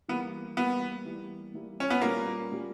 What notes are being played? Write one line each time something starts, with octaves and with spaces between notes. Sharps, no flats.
E3 G3 A#3 B3
E3 G3 A#3 B3
E3 G3 A#3 E4
E3 G3 A#3 E4
C#4
B3
A#2 G3 A#3 C#4
A#2 G3 C#4